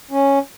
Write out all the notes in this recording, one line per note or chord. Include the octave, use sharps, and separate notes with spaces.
C#4